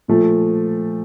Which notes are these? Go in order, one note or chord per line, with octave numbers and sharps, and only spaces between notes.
A#2 F3 A3